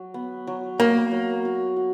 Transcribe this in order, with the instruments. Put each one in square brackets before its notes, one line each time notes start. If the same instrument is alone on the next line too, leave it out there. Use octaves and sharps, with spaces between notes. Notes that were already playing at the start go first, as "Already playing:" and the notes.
Already playing: [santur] F#3
B3
F#3
[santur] F#3 [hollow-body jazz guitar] A#3
[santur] F#3
F#4
F#4